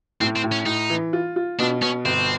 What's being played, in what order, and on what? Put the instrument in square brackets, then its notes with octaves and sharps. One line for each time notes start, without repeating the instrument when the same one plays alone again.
[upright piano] A2 [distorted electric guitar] C4
[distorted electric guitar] C4
[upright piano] A2
[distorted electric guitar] C#4
[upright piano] A2 [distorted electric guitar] D#4
[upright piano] E3
F4
F4
[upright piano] B2 [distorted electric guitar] D4
[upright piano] B2 [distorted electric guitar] C#4
[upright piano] G1 [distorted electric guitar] C4